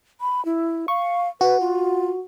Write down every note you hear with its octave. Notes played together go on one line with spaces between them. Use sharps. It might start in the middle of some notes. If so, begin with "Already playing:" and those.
B5
E4
F5 C#6
F#4 B4
F4